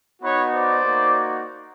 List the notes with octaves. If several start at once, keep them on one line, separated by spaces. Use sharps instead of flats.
B3 D#4 F#4 B4 C#5
C5 D5
A#3 D#4 F#4